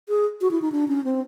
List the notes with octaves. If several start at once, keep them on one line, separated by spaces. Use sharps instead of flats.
G#4
F#4
E4
D#4
D4
C#4
C4